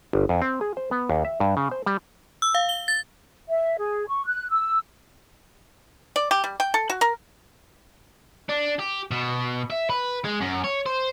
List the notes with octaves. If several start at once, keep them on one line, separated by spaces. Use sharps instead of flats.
G1
F2
C4
G#4
C5
B3
D#2
E5
G2
C#3
C5
G3
E6
F5
G7
A6
E5
G#4
C#6
F#6
E6
D5
G4
G3
G5
A4
F#4
A#4
D4
G4
B2
E5
B4
G#3
F#2
C#5
C5